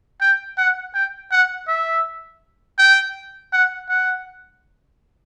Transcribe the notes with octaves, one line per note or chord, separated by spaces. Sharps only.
G5
F#5
G5
F#5
E5
G5
F#5
F#5